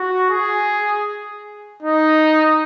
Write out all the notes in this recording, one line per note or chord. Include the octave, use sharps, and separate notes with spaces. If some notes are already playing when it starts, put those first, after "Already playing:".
Already playing: F#4
G#4
D#4